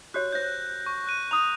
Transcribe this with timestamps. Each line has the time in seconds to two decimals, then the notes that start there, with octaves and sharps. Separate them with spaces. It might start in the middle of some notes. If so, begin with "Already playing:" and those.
0.14 F#4 G4 C#5 F#6
0.33 C5 C#5 G6 A#6
0.86 C#6
1.07 F#6 D#7
1.31 A#5 D#6 F7